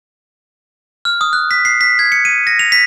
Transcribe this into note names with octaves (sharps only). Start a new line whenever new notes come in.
F6
D#6
F#6
B6
C7
B6
G#6
C#7
D#7
A#6
F7
B6